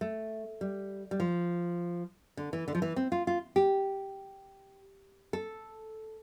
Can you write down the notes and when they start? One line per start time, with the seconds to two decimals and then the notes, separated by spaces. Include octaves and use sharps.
0.01 A3
0.61 G3
1.11 G3
1.20 F3
2.37 D3
2.53 E3
2.68 D3
2.75 F3
2.82 E3
2.96 C4
3.12 F4
3.27 F4
3.56 G4
5.33 A4